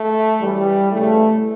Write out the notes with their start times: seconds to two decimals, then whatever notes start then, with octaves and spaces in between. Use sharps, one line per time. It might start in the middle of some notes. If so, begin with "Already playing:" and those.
Already playing: A3
0.40 F#2 E3 G3
0.92 E2 C#3 E3 A3